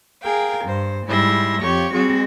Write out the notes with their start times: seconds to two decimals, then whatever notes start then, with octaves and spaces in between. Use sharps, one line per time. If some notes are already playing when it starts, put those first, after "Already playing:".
0.21 G#4 A#4 F5 G5
0.65 G2 C5
1.07 G#2 G3 E4 E5 C6 A#6
1.61 F2 F3 G4 C#5 C#6
1.92 G3 C4 F#4 G#4